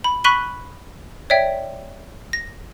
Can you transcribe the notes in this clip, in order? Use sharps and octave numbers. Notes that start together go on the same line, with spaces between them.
B5
B5 C#6 F#6 B6 D#7 G7
C#5 D5 E5 G5
A#6